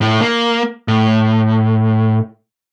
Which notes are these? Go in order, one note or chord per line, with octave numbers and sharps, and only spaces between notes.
A2 A3
A#3
A2